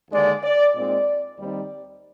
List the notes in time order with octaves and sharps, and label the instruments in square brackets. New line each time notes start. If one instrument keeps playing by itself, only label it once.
[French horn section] D#2 D3 G#3 D4 D5
D5
A#2 G#3 C4 D#4 D5
D#2 D#3 G3 C4 D#4 D5